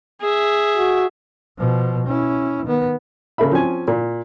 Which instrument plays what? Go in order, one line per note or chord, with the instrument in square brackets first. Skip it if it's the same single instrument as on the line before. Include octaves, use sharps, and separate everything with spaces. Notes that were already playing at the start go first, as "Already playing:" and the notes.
[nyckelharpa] G#4 E5
[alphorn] F#4
[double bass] B2 F3
C#4 E4
D#3 B3
[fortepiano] C#3 A#3 A4 E5 B5
F3 C4 C#4 G#5
A#2